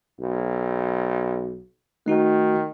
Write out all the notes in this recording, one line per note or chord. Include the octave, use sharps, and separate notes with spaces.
B1
D#3 A3 D#4 F#4